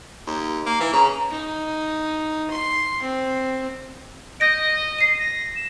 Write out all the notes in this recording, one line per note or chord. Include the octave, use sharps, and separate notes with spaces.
D#2
A#3
E3
C#3 A#5
D#4
C6
C4
D#5 G6 A#6 D7
C7 D#7
A#6
E7